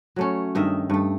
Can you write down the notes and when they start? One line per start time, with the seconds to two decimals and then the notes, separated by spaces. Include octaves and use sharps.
0.16 F#3 A3 C#4
0.55 G2 D#3 D#5 E5
0.90 G2 A3